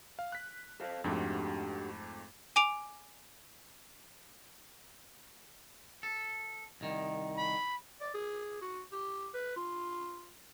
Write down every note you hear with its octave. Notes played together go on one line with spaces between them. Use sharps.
F5
F#6 B6
A4 C5 F5
F2 G#2 A3 D4 F#4 G4
G#5 D6 D7 F7
A4
C2 D#3
B5
D5
G#4
F#4
G4
B4
F4